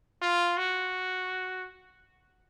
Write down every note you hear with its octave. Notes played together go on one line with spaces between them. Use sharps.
F4
F#4